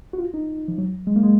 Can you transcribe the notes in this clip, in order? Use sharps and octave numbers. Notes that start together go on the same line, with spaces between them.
F#4
F4
D#4
F3
F#3
G#3
A#3
G#3